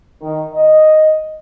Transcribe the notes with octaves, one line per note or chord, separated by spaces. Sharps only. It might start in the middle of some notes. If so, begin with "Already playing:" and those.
D#3
D#5